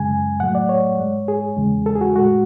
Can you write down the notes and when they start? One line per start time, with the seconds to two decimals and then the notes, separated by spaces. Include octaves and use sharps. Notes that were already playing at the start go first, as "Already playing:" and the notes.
Already playing: F#2 C#3 G#3 G#5
0.40 A2 F#3 A3 F#5
0.55 D5
0.69 C#5
0.99 G#2 G#3
1.28 G#4
1.57 E2 C#3 G#3
1.86 A4
1.95 G#4
2.01 F#4
2.16 A2 G#3 F#4